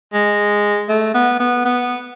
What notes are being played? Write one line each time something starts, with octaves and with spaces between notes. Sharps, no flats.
G#3
A3
B3
B3
B3